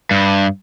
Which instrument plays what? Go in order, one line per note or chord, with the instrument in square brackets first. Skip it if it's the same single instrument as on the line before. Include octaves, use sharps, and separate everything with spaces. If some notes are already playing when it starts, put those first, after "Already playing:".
[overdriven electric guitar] G2